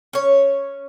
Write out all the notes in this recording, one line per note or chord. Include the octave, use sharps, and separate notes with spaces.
C#4 C#5